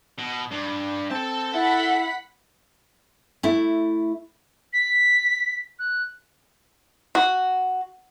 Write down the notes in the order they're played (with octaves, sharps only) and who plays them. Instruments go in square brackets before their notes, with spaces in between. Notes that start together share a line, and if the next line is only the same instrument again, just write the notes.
[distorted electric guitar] B2
G2
[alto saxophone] C4 [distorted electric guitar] A4 A5
[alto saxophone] E4 [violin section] F#5 B5 B6
[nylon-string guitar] A3 E4
[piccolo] B6
F#6
[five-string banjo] F#4